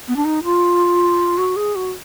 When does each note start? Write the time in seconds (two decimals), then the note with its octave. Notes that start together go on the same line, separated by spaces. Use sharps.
0.08 B3
0.16 D4
0.25 D#4
0.44 F4
1.38 F#4
1.56 G#4
1.75 F#4